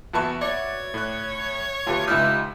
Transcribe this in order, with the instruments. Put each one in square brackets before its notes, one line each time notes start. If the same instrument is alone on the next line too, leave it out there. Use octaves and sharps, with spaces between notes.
[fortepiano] E2 A5 C#6 [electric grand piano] F#4 B4 E5
[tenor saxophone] C#5 [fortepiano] D5
[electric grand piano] A2 F#6
[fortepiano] D2 [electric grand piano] F4 G4 B4
[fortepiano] C#2 E4 F6 [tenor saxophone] D#4